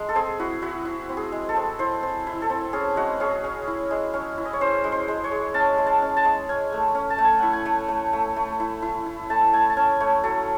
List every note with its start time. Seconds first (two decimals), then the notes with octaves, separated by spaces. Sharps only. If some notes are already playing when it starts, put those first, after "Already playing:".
Already playing: G#3
0.09 A4
0.15 C4 G#4
0.39 E4 F#4
0.62 E4 F#4
0.85 E4
1.09 C4
1.17 G#4
1.32 G#3
1.49 A4
1.56 C4
1.79 E4 C5
2.03 C4
2.27 E4
2.42 A4
2.50 C4
2.73 C#4 G#4
2.96 G#3 F#4
3.20 C#4 G#4
3.44 C#4
3.67 E4
3.91 G#3
4.14 C#4
4.38 E4
4.45 D#5
4.53 C#5
4.61 C#4 C5
4.84 G#3
4.92 C5
5.08 G#3
5.24 C#5
5.31 G#3
5.54 C#4 A5
5.78 G#3
5.87 A5
6.02 C#4
6.17 A5
6.24 G#3
6.49 C#4 G#5
6.72 A3
6.95 C#4
7.10 A5
7.18 A3
7.24 G#5
7.39 E4 F#5
7.53 G#5
7.66 A3
7.89 A3
8.13 A3
8.36 A3
8.60 E4
8.82 E4
9.06 E4
9.30 A3 A5
9.53 A3 G#5
9.70 A5
9.77 C#4 G#5
10.00 A3 C#5
10.23 F#3 A4